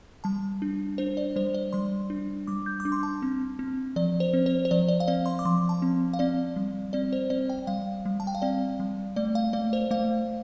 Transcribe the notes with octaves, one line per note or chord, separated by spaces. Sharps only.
G3 A5
D4
D4 C5
D5
G3 C5
D5
G3 C6
D4
G3 D6
G6
D6
D4
C6
A5
C4
C4
F3 D5
C5
C4
C5
C5
F3 D5
D5
F5
C4 D5
C6
D6
F3 C6
A5
C4
F5
C4 D5
G3
C4 D5
C5
C4 D5
G5
G3 F5
G3
A5
G5
F5
C4 D5
G3
A3 D5
F5
A3 D5
C5
A3 F5